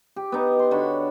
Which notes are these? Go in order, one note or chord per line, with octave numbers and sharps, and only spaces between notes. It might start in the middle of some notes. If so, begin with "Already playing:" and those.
G4
B3 D#4
C6
D3 F#4 C#5 B5